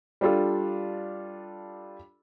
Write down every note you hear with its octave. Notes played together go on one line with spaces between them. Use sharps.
G3 D4 F4 A4